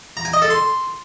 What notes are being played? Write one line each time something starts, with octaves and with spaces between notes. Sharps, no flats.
A#5
G#5
D#5
A4
C6